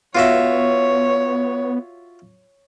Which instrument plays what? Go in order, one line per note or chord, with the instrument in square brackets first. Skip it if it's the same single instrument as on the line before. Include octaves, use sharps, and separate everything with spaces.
[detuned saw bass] B3 [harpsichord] F4 F#4 E5 [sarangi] C#5